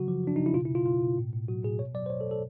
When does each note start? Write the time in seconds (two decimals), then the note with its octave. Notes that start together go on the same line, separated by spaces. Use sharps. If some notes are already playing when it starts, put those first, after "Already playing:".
Already playing: C#3 F#3 F#4
0.08 F3
0.24 F3 D4
0.36 C#3 D#4
0.46 E4
0.54 B2 F4
0.65 E4
0.70 B2 F4
0.86 B2 F4
1.02 B2
1.18 A2
1.33 A2
1.48 F#3 F#4
1.63 A2 G#4
1.79 B2 C#5
1.94 F#3 D5
2.06 C5
2.10 B2 C#5
2.21 A4
2.26 B2
2.31 A4